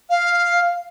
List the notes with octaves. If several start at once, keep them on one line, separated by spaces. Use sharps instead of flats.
F5